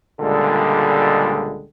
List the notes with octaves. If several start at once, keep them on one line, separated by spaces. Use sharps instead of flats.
C#2 A#2 D3 G3 G#3 A4